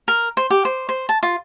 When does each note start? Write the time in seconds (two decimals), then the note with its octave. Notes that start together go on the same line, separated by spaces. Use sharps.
0.08 A#4
0.37 C5
0.50 G4
0.65 C5
0.89 C5
1.09 A5
1.23 F4